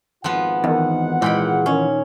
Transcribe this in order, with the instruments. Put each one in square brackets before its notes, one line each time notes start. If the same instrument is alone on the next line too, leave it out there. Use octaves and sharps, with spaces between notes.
[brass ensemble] G#1 F4 F#5 [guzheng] F3 B3
[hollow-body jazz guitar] E2 [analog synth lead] D#3
[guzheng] A#2 G5 B5 [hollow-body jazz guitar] E3 [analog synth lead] G#3
[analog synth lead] D#3 [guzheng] C#4